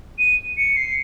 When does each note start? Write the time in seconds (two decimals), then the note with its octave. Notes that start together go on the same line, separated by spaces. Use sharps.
0.19 D#7
0.57 C#7
0.76 C7